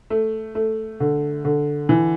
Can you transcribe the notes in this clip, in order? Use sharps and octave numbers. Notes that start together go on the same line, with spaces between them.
A3
A3
D3
D3
E3